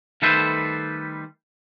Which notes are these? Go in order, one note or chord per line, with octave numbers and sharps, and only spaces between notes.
D#3 G3 A3 A4 B4 C5